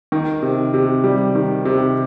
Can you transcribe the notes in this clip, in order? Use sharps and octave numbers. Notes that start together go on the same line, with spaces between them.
D#3
C3
C3
G3
D#3
C3